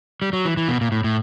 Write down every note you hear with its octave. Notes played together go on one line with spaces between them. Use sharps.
G3
F#3
E3
E3
B2
A#2
A2
A2